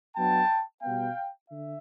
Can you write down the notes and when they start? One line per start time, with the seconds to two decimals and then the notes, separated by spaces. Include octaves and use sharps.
0.16 F#3 B3 D4 G5 A5
0.82 B2 G3 B3 F5 G5
1.50 D3 E5